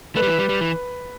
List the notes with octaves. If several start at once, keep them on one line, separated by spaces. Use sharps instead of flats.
A3 B4
G3
E3
G3
G3
E3